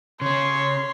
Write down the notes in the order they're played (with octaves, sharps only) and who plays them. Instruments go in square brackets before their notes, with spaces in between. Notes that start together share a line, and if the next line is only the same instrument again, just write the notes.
[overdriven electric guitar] C#3 C#4 [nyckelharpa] C#5 [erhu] C6